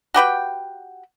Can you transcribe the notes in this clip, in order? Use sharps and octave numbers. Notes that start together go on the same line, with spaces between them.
F#4 G4 B4 G5